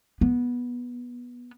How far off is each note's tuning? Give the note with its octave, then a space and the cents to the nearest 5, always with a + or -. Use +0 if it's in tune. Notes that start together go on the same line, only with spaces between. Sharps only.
B3 -15